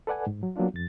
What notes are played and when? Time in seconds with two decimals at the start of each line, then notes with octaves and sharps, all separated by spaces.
0.07 A4 B4 D5 F#5 G#5
0.27 G#2
0.43 F#3
0.56 F#3 A#3 B3 D4 F4
0.74 F2 A6